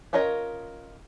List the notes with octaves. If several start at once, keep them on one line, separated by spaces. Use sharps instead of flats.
C#4 F4 A#4 C#5 D#5